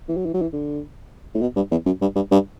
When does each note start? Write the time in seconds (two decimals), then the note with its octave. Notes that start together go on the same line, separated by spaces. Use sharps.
0.08 E3
0.17 F#3
0.25 E3
0.34 F#3
0.42 E3
0.53 D3
1.35 A2
1.41 B2
1.56 G2
1.71 E2
1.86 F#2
2.01 G2
2.16 G2
2.31 G2